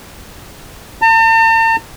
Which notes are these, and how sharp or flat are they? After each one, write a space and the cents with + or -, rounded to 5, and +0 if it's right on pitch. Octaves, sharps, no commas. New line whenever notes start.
A5 +45